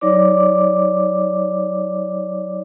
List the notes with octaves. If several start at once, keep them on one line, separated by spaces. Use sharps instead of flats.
F#3 D#4 C#5 D5 D6